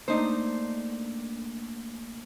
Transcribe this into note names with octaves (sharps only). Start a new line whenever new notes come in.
A3 A#3 D4 D#4 C5